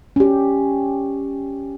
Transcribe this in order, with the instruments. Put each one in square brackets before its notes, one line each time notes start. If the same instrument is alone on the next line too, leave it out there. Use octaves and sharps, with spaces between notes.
[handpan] C#4 G4